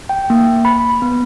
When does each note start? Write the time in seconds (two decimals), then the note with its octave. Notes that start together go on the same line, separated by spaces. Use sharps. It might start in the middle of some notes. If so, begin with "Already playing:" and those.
0.09 G5
0.30 A#3
0.65 B5
0.90 B5
1.02 B3